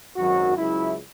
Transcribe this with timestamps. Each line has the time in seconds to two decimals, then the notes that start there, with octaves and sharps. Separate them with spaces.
0.16 G#1 F#2 D#3 F#3 F#4
0.57 C#2 C#3 F#3 E4